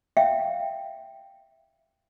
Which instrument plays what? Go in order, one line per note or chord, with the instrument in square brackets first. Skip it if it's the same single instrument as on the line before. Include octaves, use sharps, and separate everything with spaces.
[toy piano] E5 F5 G5